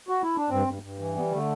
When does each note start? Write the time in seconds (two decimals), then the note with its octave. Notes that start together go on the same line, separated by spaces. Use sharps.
0.08 F#4
0.23 E4
0.36 D4
0.50 G2 C4
0.67 G2
0.82 G2
0.99 E3
1.15 G3 B3
1.31 D3 A3